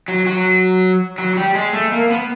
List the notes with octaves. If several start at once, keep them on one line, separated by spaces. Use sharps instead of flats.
F#3
F#3
F#3
G3
G#3
A3
A#3
B3